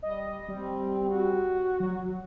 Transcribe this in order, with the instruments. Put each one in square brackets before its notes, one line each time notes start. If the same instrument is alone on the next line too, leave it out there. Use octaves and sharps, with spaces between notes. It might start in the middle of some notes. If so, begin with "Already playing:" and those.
[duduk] G3 [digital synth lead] D#5
[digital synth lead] G3 [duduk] C4
[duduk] F#4
[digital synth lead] F#3